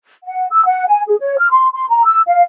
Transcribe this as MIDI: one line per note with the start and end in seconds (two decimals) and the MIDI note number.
0.25 0.46 78
0.51 0.62 88
0.66 0.87 78
0.88 1.02 80
1.08 1.15 68
1.19 1.35 73
1.38 1.47 89
1.50 1.68 84
1.73 1.85 84
1.89 2.03 82
2.05 2.20 88
2.27 2.42 77